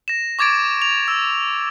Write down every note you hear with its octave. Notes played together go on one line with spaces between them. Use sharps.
A#6 E7
C#6 D6 G#6 A6 D7
F7
E6